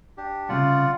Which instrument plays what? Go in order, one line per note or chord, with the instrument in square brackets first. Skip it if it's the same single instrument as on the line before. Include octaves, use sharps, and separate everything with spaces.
[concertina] D4 G4
[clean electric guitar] C2 A2 C#3 [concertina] F4 D5 F#5